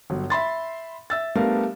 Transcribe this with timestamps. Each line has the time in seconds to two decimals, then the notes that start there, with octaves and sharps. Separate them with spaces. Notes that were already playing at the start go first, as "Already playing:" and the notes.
0.10 G1 F#3
0.30 E5 B5 C6 A6
1.10 E5 E6 A6
1.35 G3 A3 B3 D4 A#4 F5